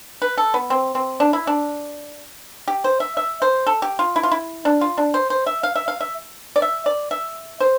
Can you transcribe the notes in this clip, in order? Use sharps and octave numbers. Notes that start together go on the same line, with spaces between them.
B4
A4
B3
C4
C4
D4
E4
D4
G4
C5
E5
E5
C5
A4
G4
F4
E4
F4
E4
D4
F4
D4
C5
C5
E5
F5
E5
F5
E5
D5
E5
D5
E5
C5